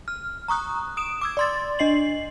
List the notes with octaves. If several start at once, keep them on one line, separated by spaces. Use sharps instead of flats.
F6
A#5 C#6 D#6 F#6
D#6 D7 E7
D6 E6 G#6
D5 C6 A6
D4 D#5 C7 F#7